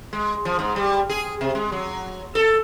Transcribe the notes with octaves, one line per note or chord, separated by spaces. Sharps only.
G#3
F3
G#2
G3
G#4
C3
G#3
F#3
A4